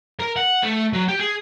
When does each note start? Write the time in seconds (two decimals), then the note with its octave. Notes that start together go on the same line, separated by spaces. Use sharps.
0.20 A#4
0.36 F#5
0.63 A3
0.93 F#3
1.08 G4
1.20 G#4